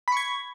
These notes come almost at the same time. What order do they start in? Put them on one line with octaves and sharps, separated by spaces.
B5 C#6 G#6